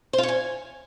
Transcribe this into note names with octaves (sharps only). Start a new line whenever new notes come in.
C5
F4
C#5
G#5